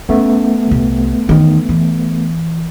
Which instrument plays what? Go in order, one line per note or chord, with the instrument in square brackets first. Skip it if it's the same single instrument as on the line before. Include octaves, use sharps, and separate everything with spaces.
[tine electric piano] A3 B3 [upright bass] C#4
[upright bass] C2 C3
E2 D#3
E3